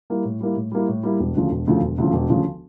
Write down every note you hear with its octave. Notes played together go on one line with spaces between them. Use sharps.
G3 A#3 E4
A2
G3 A#3 E4
A2
G3 A#3 E4
A2
G3 A#3 E4
E1
D2 C#3 F3
E1
D2 C#3 F3
E1
D2 C#3 F3
E1
D2 C#3 F3